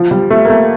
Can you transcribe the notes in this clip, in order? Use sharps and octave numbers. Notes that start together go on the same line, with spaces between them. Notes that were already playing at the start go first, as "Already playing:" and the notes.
Already playing: F3
G3
A3
A#3
A3